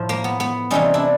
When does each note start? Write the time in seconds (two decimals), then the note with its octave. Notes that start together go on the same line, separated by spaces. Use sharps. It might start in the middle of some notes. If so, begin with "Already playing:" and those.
Already playing: A2 F3
0.09 A#3
0.24 B3
0.40 B3
0.71 C3 E3 G3 C#4 D#4
0.94 D4 E4